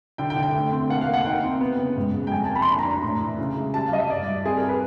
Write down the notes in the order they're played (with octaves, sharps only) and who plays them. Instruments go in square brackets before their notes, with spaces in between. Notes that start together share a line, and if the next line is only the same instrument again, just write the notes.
[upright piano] D3 G5
G5
D3
G5
A3
C4
A#3 F#5
F5
A#3
F#5
D#4 G5
C4
B3
C#3
G#2
G#3
G5
F2 G#5
A5
A#3
B5
C6
D4 B5
A#5
D4
A#5
A2
E3
C#3
G#3
G3 A5
F5
G3 D#5
E5
G2 D5
G2
C4 G#4
A#4
B4